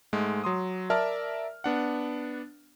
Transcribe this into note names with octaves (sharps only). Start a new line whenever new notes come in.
G#2 G#3 A3
F#3 C6 D#6
A#4 D5 E5 A5 F6
B3 D4 F#5